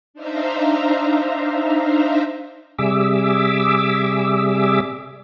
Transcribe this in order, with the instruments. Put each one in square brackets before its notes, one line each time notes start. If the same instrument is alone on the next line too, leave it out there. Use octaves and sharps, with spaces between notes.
[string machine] D4 D#4 C5 E5 F5 A#5
[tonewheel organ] C3 G3 G#4 E5 D6 E6